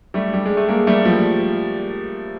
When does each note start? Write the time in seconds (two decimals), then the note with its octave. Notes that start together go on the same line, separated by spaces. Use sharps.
0.14 G3 A3
0.34 G3
0.46 G#3
0.57 A3
0.68 G#3 A#3
0.79 A#3
0.87 G3 A3
1.05 F3 G3